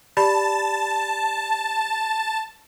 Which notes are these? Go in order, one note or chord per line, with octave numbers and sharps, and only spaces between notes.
G4 D5 A5 B5